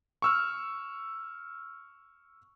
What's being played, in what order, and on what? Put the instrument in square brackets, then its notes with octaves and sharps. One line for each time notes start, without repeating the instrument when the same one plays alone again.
[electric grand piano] C#6 E6 F6